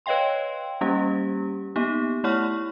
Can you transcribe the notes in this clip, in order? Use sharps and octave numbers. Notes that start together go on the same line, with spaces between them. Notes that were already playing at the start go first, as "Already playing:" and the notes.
B4 C#5 D#5 F5 G5 C6
G3 A#3 C#4 G4
A#3 B3 D#4 G4
A3 E4 C#5 F#5 C#6 F6